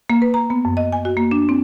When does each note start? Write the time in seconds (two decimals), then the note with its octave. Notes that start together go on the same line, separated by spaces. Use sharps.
0.10 A#3
0.22 B4
0.34 A#5
0.50 B3
0.65 F#2
0.77 D#5
0.92 G#5
1.05 F#4
1.17 A#3
1.31 D4
1.49 C4